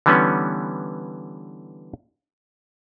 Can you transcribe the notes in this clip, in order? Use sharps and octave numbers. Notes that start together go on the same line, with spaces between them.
D3 E3 G3 B3 C#4